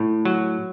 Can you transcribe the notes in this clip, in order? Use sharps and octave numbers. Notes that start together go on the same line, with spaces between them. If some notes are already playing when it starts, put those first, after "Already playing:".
Already playing: A2
F#3